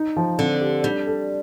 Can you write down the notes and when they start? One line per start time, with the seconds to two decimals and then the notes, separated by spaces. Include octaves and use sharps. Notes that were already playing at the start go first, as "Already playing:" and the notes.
Already playing: D#4
0.17 F3
0.38 D3 C4
0.61 G4
0.84 G3 D4
1.07 A4